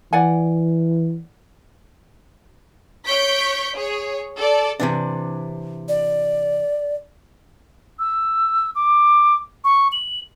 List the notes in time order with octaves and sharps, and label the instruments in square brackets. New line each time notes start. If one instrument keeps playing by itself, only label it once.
[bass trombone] E3 [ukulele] D5 F#5 G#5
[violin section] C#5 C#6 G6 B6 D7
G#4 C#5
A4 D5
[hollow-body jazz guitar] C3 E3 D4
[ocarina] D5
[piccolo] E6
D6
C#6
F#7